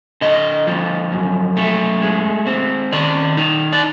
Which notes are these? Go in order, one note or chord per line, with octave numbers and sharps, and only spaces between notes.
D3 D#5
F3
F#2
A3
G#3
C4
D#3 D5
D#4
D5